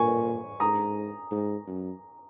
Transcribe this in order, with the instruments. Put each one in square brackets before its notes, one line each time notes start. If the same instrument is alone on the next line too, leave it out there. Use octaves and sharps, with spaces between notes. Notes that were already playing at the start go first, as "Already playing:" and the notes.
Already playing: [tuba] A#2 [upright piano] G#5 C#6
[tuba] G#2 [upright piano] A#5 D#6
[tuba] G#2
F#2